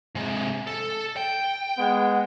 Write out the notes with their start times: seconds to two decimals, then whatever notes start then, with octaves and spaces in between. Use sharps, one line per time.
0.15 C3 G#3
0.67 A4
1.17 G5
1.78 G#3 B3 F#5